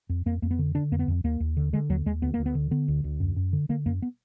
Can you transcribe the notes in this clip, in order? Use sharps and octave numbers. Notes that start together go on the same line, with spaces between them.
F2
F2 A#3
F2 A#3
B3
D3
D3 D4
F2 A#3
B3
F2
D#2 A#3
D#2
D3
D3 G#3
D#2 F#3
D#2 G#3
D2 B3
D2 A#3
B3
D3
D3 B3
D2
D2
F#2
F#2
D3
D3 A#3
F#2 A#3
B3